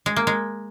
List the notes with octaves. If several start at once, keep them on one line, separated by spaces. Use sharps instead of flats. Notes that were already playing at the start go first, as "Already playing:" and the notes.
G#3
A#3
G#3